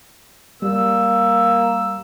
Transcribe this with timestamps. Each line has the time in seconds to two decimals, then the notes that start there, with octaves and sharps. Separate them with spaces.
0.62 G3 A#3 E6